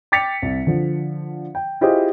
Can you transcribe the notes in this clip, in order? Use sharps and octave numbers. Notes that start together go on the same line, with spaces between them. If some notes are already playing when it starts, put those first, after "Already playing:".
G5 D6 A6 B6 C#7 F7
C2
D3 F3
G5
E4 F4 G4 G#4 C5 D#5